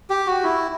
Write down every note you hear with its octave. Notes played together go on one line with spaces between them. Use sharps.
G4
F#4
E4